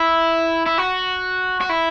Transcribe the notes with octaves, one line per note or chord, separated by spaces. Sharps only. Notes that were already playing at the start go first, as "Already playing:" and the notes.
Already playing: E4
E4
F#4
F#4
E4